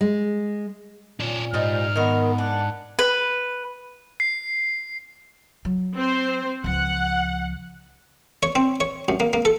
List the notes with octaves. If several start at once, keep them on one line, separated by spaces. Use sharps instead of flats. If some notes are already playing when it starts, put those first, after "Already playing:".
G#3
A#2 C#4 D5
G#2 F3 G3 D#4 F6
D#3 B3 A#4
D4 F#5
B4
C7
F#3
C4 C5
C#2 F3 F#5
C#5
C4
C#5
F#2
A#3
A#3
A4